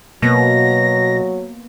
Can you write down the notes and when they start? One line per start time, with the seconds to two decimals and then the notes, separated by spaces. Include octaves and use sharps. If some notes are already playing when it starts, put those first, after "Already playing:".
0.22 B2 F#3 A#3 B3 A#6